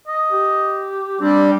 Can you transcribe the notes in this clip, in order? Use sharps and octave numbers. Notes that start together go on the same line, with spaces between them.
D#5
G4
G3 C4 D4